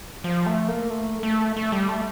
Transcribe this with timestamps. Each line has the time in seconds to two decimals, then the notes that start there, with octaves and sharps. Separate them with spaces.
0.24 F3
0.46 A3
0.68 A#3
0.90 A3
1.23 A3
1.57 A3
1.72 G3
1.89 A3